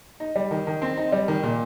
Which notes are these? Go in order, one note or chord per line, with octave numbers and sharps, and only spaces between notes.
D#4
G3
D#3
D#3
C4
D#4
G3
D#3
A#2